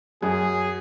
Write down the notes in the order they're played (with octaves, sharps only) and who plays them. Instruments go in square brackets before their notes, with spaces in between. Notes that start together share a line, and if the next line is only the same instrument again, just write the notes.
[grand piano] F#2 [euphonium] F#3 [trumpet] G#4